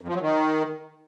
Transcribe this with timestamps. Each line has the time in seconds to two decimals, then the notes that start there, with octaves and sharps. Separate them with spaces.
0.01 F2
0.08 F3
0.15 F#3
0.21 D#3